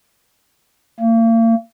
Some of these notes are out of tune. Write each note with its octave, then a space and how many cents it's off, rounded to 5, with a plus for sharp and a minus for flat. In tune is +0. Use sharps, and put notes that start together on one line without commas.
A#3 -40